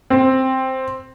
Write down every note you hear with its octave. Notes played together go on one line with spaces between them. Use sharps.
C4